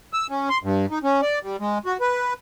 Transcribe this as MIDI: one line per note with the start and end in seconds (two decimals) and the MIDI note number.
0.13 0.27 88
0.30 0.49 61
0.49 0.58 84
0.63 0.86 43
0.91 0.99 63
1.03 1.21 61
1.22 1.39 74
1.43 1.56 55
1.60 1.78 56
1.86 1.97 66
2.01 2.34 71